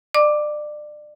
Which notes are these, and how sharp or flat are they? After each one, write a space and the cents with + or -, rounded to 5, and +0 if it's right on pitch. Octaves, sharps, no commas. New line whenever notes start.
D5 +30 D6 +0